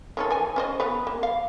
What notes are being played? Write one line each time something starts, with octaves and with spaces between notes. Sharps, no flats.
D#3 C#4 A4
E3 G#5
C#4 C5 D#5
B3 B4
A#3
F5